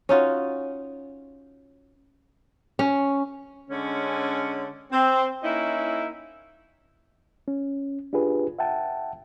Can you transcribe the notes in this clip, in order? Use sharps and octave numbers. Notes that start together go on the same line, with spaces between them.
C#4 D#4 F4 F#4
C#4
D3 G#3 C#4
C4
A#3 C#4 D#4 E4
C#4
D4 F4 G4 G#4 B4
E5 F#5 G5 A5